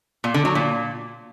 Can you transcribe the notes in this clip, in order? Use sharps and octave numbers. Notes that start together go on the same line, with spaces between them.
A#2
D3
F#3
A#2